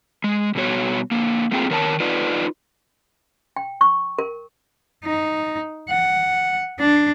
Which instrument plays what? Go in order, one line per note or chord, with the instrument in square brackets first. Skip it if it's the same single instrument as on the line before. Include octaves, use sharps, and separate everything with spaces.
[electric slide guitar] G#3
B2 G3 B3 F#4 C#5
D3 A#3
A3 A#3 C4 F4 G#4 G5
D#3 A#4 C#5 F#5 A5
D#4 F4 B4 D5 D#5
[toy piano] G5
C#6
A#4
[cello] D#4
F#5
D4